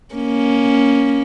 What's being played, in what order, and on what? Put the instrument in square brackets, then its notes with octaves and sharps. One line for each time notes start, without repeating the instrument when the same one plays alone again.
[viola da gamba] A#3 C#4